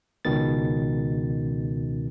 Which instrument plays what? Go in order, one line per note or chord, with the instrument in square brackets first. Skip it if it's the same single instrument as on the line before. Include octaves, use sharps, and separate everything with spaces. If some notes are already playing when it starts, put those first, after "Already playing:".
[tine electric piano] C#2 B2 D#3 A6